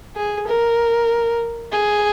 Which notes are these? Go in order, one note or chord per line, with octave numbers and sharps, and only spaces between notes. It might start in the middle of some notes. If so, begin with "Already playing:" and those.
G#4
A#4
G#4